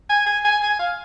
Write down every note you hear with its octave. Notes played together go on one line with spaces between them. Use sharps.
G#5
G#5
G#5
G#5
F5